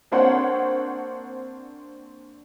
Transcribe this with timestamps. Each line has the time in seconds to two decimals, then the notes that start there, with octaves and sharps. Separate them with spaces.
0.12 A#3 C4 D4 C5 C#5 F#5